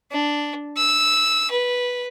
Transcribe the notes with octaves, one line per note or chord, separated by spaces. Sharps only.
D4
E6
B4